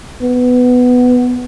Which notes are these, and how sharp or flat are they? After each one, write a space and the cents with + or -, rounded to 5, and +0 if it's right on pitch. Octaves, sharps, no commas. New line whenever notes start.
B3 +10